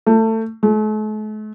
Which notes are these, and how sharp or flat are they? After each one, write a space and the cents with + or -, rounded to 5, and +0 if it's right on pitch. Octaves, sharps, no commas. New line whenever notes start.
A3 +20
A3 -45